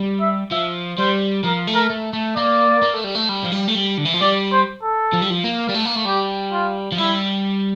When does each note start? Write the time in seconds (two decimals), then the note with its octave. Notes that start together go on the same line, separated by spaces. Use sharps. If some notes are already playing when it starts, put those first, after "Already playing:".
Already playing: G3
0.21 E5
0.51 F3 E5
0.98 G3 C5
1.44 F3 A#4
1.67 A3
1.75 A#4
1.90 A3
2.13 A3
2.36 A#3 D5
2.82 A#3
2.94 A3
3.04 G3
3.15 A3
3.29 G3
3.44 F3
3.52 G3
3.68 A3
3.75 G3
3.98 D3
4.05 E3
4.14 F3
4.21 G3 D5
4.52 C5
4.83 A4
5.13 F3
5.22 G3
5.31 F3
5.44 A#3
5.69 G3
5.75 A3
5.86 A#3
5.96 A3
6.06 G3 G4
6.52 F4
6.92 F3
6.98 G3 E4